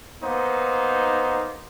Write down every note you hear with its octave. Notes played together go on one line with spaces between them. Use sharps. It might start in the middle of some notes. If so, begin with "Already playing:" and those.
A#3 B3 D#4 C5